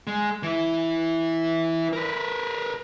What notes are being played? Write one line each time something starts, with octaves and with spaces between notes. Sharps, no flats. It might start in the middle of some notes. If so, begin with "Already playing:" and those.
G#3
E3 E4
A#4 B4